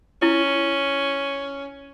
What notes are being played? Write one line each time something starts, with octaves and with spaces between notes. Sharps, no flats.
C#4 E4